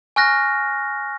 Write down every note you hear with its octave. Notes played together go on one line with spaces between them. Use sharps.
G#5 C#6 F6 F#6 A#6